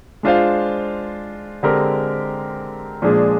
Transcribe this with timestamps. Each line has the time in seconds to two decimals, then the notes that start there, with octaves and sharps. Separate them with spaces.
0.23 G#3 D4 F4 C5 F5
1.63 D3 G#3 C4 G4 A#4
3.02 A#2 F3 G#3 D4 G#4